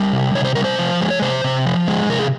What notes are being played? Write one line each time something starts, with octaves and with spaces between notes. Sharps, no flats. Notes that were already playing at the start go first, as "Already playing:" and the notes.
Already playing: G3 A#4
C3
C3 C#5
C5
G3 A#4
C5
F3
G#3
C#5
C3 C5
C3
F3
G#3
C3 A#4
G#4